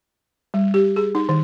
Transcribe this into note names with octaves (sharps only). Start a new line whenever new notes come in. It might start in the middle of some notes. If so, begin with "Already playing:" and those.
G3
G4
G#4
D#4
D#3